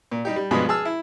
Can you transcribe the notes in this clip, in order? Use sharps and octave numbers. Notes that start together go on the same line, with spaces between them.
A#2
G3 D#4 G4
G3
G2 B2 F3 G#3 B5 D#6
G#4 A5 E6 F6
E4